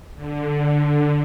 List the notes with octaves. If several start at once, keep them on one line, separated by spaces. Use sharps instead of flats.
D3